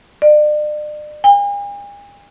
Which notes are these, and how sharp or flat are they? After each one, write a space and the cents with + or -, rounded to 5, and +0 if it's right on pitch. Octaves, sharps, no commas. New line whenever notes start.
D5 +40
G#5 -45